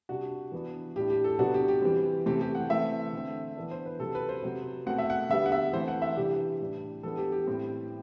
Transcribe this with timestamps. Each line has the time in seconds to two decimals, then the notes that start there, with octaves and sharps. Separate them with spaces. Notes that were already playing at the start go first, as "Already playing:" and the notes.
0.09 C3 G3 D4 F#4
0.52 E3 B3 D4
0.96 A2 G3 D4 G4
1.10 G4
1.24 A4
1.39 C3 F#3 B3 D4 F#4
1.54 G4
1.68 G4
1.82 E3 G3 C4
2.26 C3 E3 A3 C4 G4
2.41 G4
2.55 F#5
2.70 E3 A3 C4 E5
3.13 D3 A3 C4
3.56 E3 B3 D4
3.71 C5
3.86 B4
3.99 C3 F#3 C4 A4
4.15 B4
4.29 C5
4.43 C3 F#3 C4
4.86 B2 A3 C4 F#5
4.98 E5
5.10 F#5
5.29 D3 G3 B3 E5
5.46 F#5
5.52 E5
5.73 E3 A3 C4 C5
5.88 F#5
6.02 E5
6.16 C3 E3 G3 D4 G4
6.60 A2 G3 D4
7.03 E3 G3 B3 D4 A4
7.18 G4
7.32 G4
7.47 A2 G3 C4